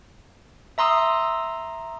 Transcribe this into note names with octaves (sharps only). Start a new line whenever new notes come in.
E5 A#5 C6 D#6 E6